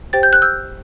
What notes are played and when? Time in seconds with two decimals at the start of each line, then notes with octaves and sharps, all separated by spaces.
0.13 G4 C5 G5 A6
0.23 G6
0.33 F#6
0.42 E6 G6